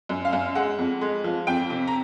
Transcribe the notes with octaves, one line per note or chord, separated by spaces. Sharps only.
F#2
F5
F#2
G#3 F#5
F2
G#3
F3
F2 G5
C3
A#5